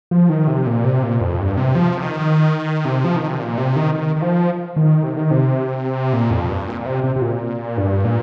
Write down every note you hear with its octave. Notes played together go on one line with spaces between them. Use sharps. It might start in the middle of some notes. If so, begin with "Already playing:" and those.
F3
D#3
C3
A#2
C3
A#2
F2
G2
C3
F3
C3
D#3
C3
F3
D#3
C3
A#2
C3
D#3
D#3
D#3
F3
D#3
C3
D#3
C3
A#2
F2
G2
A#2
A#2
C3
C3
C3
A#2
G2
A#2